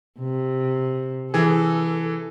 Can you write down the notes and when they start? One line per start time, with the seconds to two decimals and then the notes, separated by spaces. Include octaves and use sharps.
0.20 C3
1.34 E3 G#4 A4